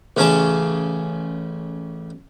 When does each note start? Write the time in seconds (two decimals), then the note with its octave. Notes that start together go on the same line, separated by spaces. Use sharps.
0.17 A1 C#3 C#4 G#4 A5 D6